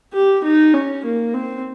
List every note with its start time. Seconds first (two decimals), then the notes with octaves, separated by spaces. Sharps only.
0.13 G4
0.44 D#4
0.74 C#4
1.05 A#3
1.34 C4